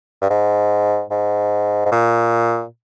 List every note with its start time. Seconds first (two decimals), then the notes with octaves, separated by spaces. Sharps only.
0.22 G2
0.30 G#2
1.11 G#2
1.86 G#2
1.92 A#2